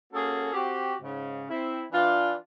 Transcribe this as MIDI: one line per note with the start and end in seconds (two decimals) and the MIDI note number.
0.13 0.50 58
0.13 0.50 61
0.13 0.50 66
0.13 0.50 68
0.13 0.50 69
0.53 0.94 60
0.53 0.94 66
0.53 0.94 67
1.02 1.44 44
1.02 1.44 49
1.49 1.83 60
1.49 1.83 64
1.92 2.33 52
1.92 2.33 62
1.92 2.33 65